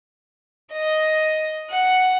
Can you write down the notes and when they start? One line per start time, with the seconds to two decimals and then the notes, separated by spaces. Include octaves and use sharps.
0.73 D#5
1.71 F#5